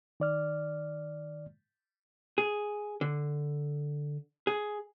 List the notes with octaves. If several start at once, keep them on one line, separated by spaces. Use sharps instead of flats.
D#3 D5 F6
G#4
D3
G#4